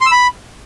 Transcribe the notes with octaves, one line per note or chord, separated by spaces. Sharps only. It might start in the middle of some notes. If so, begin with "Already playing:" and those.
C6
E6
B5